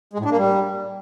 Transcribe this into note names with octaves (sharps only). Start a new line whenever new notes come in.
G#3
A2
D4
A#3
G3